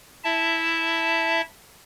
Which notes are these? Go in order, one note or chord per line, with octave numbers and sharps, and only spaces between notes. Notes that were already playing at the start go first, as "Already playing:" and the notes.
E4 E5 A5